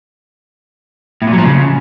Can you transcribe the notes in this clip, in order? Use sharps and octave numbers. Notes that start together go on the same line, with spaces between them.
A2
A#2
F#3
F3
C#3